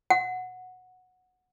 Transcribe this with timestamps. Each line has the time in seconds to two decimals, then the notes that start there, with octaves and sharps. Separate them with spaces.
0.10 F#5